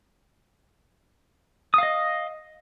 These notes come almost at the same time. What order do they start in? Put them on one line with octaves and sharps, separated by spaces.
D#6 F5 D#5